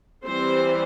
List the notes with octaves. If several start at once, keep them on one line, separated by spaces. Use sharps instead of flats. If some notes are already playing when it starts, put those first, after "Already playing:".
E3 G3 C4 C5